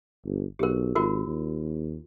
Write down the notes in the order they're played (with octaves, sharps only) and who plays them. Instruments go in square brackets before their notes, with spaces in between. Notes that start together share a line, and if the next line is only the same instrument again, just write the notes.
[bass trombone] G1
[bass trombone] B1 [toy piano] G4 A#4
[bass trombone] G#1 [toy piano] F4 F#4 A#4
[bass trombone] D#2